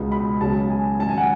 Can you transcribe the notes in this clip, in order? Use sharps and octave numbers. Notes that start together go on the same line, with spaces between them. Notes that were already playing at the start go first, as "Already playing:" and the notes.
Already playing: C#2 B2 G#3 B3
B5
C#2 C#3 F#3 B3 A5
G#5
G#2 D#3 F#3 C#4 A5
G#5
F#5